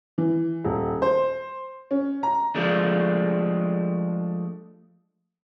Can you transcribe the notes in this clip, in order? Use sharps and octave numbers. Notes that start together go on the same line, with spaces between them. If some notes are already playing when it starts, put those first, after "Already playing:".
E3
D#1
C5
C#4
A#5
F3 G#3 A3 D4